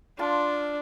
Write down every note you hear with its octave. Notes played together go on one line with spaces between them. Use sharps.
D4 F4 A5 C6